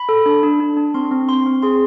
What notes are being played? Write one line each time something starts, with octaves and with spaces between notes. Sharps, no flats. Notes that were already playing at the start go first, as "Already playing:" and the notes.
Already playing: B5
A4
D4
D4
D4
D4
C4 C6
C4
C4 C6
C4
G#4 C6